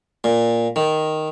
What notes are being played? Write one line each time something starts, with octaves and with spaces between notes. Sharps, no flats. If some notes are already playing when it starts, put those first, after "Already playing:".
A#2
D#3